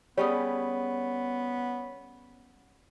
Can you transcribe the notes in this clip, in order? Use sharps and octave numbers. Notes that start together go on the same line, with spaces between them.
G3 B3 C#4 G#4 C#5